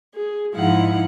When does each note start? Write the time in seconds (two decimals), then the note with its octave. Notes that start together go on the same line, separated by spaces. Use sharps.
0.14 G#4
0.55 G#2 F3 D#4 E4 F5 F#5